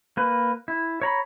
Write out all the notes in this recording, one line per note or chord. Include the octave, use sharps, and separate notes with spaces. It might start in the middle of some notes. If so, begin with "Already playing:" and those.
A#3 B4
E4
C#5 A#5 B5